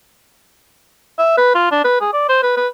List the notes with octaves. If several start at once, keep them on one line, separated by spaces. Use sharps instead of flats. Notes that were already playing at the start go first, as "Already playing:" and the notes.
E5
B4
F4
D4
B4
G#4
D5
C5
B4
B4